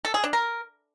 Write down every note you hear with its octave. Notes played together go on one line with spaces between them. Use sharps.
A4
G#4
D4
A#4